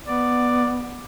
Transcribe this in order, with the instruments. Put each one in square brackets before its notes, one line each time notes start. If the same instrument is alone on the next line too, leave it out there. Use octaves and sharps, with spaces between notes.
[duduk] B3 [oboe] D5